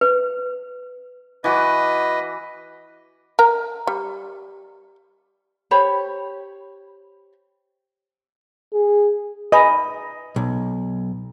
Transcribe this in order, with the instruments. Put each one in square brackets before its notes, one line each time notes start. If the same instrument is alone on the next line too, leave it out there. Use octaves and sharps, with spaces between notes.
[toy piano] B4
[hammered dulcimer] E3 F#4 D6 [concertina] B4 D#5
[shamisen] A#4 A#5
G3
[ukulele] G4 C5 C#5 B5
[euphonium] G#4
[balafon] B4 G#5 B5 [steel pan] D#5
[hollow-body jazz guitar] B1